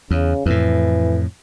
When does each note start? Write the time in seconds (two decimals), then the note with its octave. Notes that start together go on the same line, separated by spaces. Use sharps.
0.11 E2 C#3
0.46 F2 A2 E3